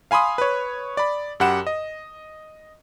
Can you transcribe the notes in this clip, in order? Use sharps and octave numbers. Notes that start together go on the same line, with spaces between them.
F5 G#5 B5 C6 D#6
B4 C#5
D5 B5
F#2 G4 F#5 B5 E7
D#5